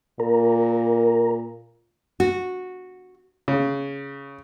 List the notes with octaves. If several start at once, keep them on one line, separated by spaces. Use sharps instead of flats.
A#2 A#4
F#4
C#3